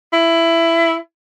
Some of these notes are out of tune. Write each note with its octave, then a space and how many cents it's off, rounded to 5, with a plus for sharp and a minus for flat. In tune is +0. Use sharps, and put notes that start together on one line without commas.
E4 +15